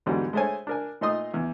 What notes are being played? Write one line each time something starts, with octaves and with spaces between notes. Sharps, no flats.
E2 G#2 D3 F#3 G3
G#3 A3 C5 C#5 G#5
D4 A#4 G#5
A#2 A3 D#4 D#5 C6 D#6
E2